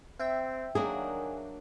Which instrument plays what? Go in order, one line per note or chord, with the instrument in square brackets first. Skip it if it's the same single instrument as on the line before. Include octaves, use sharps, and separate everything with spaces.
[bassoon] C4 [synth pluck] E5 G5
[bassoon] D#3 [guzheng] F#3 A#3 D4 [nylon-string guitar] G#4